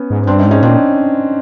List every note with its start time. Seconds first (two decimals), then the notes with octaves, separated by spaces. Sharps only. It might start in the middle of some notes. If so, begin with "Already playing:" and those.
Already playing: B3 C#4
0.10 G#2
0.27 G2 C4 D4
0.39 C#4 D#4
0.45 G#2
0.51 C#4 D#4
0.62 A#2 C4 D4